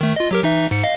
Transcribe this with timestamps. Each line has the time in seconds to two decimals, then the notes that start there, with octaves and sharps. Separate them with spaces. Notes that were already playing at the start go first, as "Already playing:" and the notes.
0.01 D#3 A3
0.16 F4 D#5
0.31 F#3 G4 A#4
0.43 E3 D#4 E5
0.71 G#2 C#7
0.83 D#5 F5